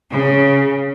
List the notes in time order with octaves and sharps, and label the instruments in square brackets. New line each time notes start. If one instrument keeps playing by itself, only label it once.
[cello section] C#3